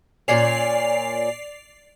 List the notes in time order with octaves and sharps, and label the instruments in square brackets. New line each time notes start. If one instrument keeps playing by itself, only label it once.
[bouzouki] A#2 C#3 C#4 [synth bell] D5 C7 F7